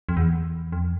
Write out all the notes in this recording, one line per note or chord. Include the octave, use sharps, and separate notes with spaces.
F2
E2
F2